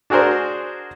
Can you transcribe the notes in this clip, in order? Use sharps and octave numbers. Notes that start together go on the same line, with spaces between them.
D4 F#4 G#4 A#4 C5